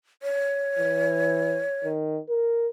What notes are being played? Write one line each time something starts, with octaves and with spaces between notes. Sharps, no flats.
C#5
E3
D#3
A#4